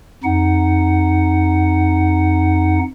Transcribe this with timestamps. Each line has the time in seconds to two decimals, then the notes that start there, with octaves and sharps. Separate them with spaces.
0.24 F2 D#4 F#5